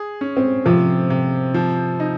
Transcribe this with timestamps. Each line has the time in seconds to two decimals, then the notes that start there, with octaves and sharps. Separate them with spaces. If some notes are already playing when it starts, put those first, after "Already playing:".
Already playing: G#4
0.21 C#4
0.37 C4
0.66 C3 F3
1.10 C3
1.54 F3
2.00 D#4